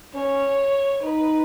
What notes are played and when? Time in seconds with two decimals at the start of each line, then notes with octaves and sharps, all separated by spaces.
0.14 C#4 C#5
1.03 D#4 B4